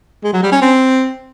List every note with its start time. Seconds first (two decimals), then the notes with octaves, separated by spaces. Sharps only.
0.24 G#3
0.33 F#3
0.43 G3
0.52 C#4
0.61 C4